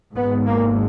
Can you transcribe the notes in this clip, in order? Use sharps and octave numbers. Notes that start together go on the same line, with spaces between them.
G#1 G#2 B3
A#3